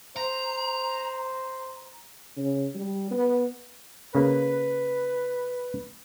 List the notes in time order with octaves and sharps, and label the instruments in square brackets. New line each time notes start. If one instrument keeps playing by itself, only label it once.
[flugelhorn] C5 [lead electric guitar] A#5
[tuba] C#3
G3
B3
[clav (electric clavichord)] C#3 A#3 [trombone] B4